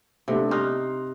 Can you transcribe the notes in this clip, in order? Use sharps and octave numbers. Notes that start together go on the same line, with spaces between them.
C3 A3 B3 D4
D#4 C6 F6 F#6